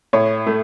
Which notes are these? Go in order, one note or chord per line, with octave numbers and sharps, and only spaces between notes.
A2 C#5
A3